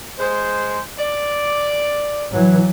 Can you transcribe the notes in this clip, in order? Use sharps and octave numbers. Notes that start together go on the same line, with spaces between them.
G#3 C5
D5
E3 F#3